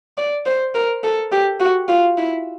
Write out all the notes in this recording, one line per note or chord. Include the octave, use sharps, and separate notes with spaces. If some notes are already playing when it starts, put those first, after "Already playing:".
D5
C5
A#4
A4
G4
F#4
F4
E4